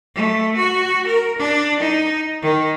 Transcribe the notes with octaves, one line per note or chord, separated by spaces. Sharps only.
A3
F#4
A#4
D4
D#4
D#3